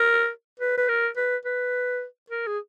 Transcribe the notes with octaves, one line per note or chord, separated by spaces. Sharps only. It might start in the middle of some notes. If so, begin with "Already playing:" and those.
Already playing: A#4
B4
B4
A#4
B4
B4
A#4
G#4